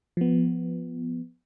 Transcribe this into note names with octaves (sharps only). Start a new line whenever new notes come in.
F3 B3